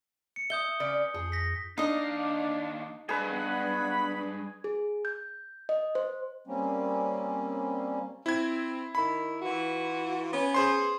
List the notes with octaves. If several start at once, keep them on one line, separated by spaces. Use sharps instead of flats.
C#7
E5 D#6 G6 G7
C#3 B4 D5
F2 G#4
A#6 B6
D#2 D4 D#4 D#5 F5
G2 G#4 B4
B3 F#5 B5
G#4
G6
D#5
C5
G3 A#3 C4 C#4
C4 E4 G#6
D#3 E4 B5
E3 F4 F#4
B3 C#4
G#4 C5 C6